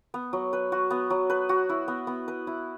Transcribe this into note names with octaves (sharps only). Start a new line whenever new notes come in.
B3
F#3
B4
F#4
B3
F#3
B4
F#4
E4
B3
B3
B4
E4